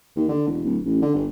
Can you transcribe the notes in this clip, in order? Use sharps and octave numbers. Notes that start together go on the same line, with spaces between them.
D#2
D3
E1
D1
A1
D3
G1